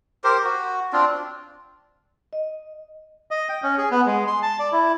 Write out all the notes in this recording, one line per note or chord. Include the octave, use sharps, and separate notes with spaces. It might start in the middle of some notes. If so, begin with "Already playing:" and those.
G4 A#4 C5
F#4
C4 D4 F4
D#5
D#5
G5
C#4
G#4
B3
G#3
C6
A5
D5
E4